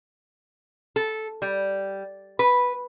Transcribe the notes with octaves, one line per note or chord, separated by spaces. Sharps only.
A4
G3
B4